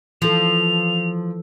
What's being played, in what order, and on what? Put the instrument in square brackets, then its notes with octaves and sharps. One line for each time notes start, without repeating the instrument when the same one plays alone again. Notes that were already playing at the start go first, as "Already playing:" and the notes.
[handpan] E3 A4 [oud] F3 [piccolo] F7